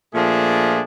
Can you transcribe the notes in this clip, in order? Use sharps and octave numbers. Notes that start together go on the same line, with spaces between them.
A#2 F3 A3 D4 G#4